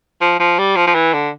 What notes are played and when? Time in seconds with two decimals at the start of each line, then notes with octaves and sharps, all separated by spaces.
0.21 F3
0.39 F3
0.59 G3
0.76 F3
0.87 F3
0.94 E3
1.13 D3